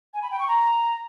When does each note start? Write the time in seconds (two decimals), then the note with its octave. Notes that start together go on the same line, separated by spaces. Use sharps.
0.14 G#5
0.22 B5
0.31 G5
0.39 C#6
0.48 A#5